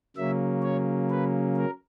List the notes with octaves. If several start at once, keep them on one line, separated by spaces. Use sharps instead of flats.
C#3 F#3 A#3 C#4 E5
C#5
B4
A#4